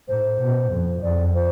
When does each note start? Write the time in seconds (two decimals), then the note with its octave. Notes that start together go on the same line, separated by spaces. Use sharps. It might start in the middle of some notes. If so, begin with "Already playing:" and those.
0.08 A2 C5
0.40 B2
0.71 F2
1.03 F2 D5
1.34 C5